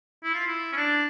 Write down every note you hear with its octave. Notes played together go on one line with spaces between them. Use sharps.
E4
F4
E4
C#4
D4